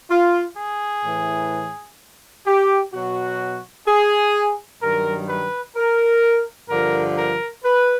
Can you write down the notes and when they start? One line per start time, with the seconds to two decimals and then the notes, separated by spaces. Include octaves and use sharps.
0.11 F4
0.57 G#4
1.05 A2 E3
2.46 G4
2.93 B2 F#3 F#4
3.87 G#4
4.81 G2 D#3 F#3 A#4
5.29 B4
5.76 A#4
6.70 G2 D3 F3 A#4
7.17 A#4
7.64 B4